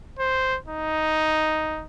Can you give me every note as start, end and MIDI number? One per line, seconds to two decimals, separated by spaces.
0.19 0.57 72
0.68 1.85 63